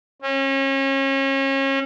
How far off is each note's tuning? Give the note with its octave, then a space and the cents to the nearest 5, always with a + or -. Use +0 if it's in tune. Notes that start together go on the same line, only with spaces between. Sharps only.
C#4 -35